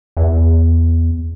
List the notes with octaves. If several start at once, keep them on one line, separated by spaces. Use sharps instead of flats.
E2